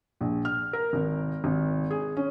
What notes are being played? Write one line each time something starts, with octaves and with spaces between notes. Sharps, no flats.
A#1
F6
A#4
G#1
G#1
G#4
C#4